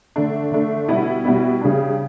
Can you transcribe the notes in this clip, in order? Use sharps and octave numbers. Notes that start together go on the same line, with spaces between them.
D3 A3 D4
D3 A3 D4
B2 G3 B3 E4
B2 G3 B3 E4
C#3 G3 D4